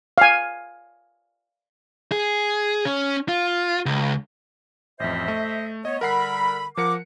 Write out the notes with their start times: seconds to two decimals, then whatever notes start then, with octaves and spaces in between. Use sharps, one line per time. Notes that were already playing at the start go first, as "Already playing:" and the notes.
0.18 F5 G#5
2.12 G#4
2.85 C#4
3.29 F4
3.86 C#2
5.00 A1 F2 C5 D#5 E5
5.28 A3
5.85 A3 B3 C#5 D#5
6.01 D3 G3 A#4 F#5 B5 C7
6.77 F3 A#4 F#5 D6 C#7